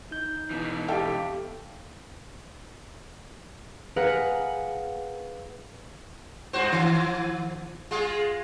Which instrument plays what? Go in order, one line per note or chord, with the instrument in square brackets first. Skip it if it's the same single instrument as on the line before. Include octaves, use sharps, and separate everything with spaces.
[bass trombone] D#4 [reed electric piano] G6
[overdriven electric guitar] B2 E3
[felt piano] G4 E5 G5 [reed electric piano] A4 F5
[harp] G#4 A#4 B4 F5 F#5
[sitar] G2 F#4 C5
D#3 F3
G#3 F4 G#4